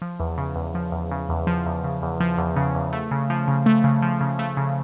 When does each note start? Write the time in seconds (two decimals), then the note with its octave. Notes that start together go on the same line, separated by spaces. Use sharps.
0.02 F3
0.20 E2
0.38 C#3
0.56 E2
0.75 F3
0.92 E2
1.11 C#3
1.29 E2
1.47 F3
1.66 E2
1.84 C#3
2.02 E2
2.20 F3
2.38 E2
2.56 C#3
2.75 E2
2.93 A3
3.11 C#3
3.30 F3
3.48 C#3
3.66 A3
3.84 C#3
4.02 F3
4.21 C#3
4.39 A3
4.57 C#3